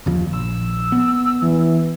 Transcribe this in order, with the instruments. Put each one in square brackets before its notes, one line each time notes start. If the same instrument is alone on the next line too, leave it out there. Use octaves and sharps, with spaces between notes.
[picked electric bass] F#1 D#2 F3
[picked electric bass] A#1 [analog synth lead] E6
[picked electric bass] B3
[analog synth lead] E3